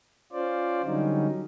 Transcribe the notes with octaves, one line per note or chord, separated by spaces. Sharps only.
C#4 F4 C5 D5
D3 F#3 G3 C#4 D#4